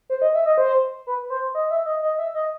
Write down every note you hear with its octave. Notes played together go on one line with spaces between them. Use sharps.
C5
D#5
E5
D#5
C5
B4
C5
D#5
E5
D#5
D#5
E5
D#5